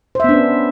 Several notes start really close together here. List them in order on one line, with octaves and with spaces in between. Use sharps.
C5 E5 B3 D4 C#4